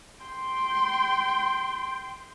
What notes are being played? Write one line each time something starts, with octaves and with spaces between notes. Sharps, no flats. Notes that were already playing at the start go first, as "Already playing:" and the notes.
G5 C6